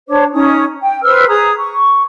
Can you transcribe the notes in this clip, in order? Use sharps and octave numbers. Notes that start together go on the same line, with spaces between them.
D4 C5 C#5 D6
C#4 D#4 C#5 D#6
G5
B4 C5 E6 F6
G#4 A#5 D#6
C#6